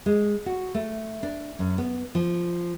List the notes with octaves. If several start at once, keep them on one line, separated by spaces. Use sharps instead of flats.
G#3
F#4
A3
D4
F#2
B3
F3